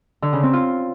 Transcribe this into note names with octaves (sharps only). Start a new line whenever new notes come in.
D3
C#3
C4
F4